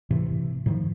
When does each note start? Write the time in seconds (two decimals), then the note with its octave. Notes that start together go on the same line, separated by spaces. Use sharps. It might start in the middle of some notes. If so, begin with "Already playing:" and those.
0.11 A2 C3 E3
0.66 A2 D#3 F3